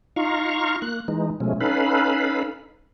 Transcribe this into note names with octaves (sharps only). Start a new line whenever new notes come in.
D#4 F4 F5 A#5 C#6
A#3 F#6
E3 G#3 D#4
B2 F3 G#3 A3 C#4
C#4 D#4 A4 B4 F5 B5